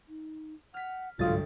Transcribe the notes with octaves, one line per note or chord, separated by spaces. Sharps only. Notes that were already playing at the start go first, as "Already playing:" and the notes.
D#4
F#5 F6 B6
G1 C2 G#2 F#3 F4 A4 D#6 A6